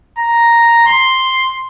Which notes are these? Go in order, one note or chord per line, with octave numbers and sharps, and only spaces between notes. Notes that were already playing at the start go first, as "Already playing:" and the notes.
A#5
C6